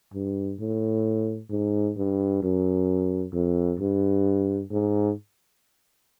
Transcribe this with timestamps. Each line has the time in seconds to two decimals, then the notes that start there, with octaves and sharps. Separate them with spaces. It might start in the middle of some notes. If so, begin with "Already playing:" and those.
0.13 G2
0.59 A2
1.50 G#2
1.97 G2
2.43 F#2
3.33 F2
3.79 G2
4.71 G#2